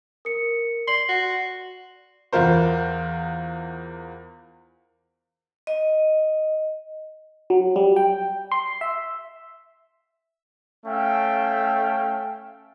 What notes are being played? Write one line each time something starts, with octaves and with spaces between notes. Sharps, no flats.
A#4 C#7
D5 C6 C7 F#7
F#4
E2 E3 F4 A#4 C5
D#5
F#3
G3
G5
C6
E5
A3 C#4 E5 F5 G5